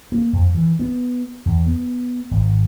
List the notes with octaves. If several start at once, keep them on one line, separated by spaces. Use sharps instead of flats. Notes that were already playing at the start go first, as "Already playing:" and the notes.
A#3
F2
E3
B3
E2
B3
G#1